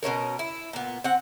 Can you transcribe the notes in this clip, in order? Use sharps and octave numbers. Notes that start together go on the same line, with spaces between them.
B2 F3 C#4 A#4
E4
A#2 B3
C4 F#5